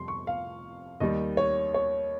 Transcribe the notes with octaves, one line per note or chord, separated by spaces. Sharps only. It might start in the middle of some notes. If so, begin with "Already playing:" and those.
Already playing: F2 C3 G3 C6
C#6
F5
D#2 D#3 G3 D#5
C#5
C#5